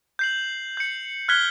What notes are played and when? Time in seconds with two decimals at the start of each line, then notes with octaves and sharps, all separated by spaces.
0.19 G6 C7 F#7
0.77 G6 C#7
1.29 F6 F#6 G#6 B6 G7